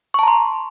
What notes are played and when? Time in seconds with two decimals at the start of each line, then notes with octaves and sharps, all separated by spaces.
0.14 C#6
0.19 A5
0.23 A#5
0.28 C6